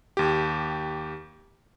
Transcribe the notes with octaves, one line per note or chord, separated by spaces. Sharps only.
D#2 G4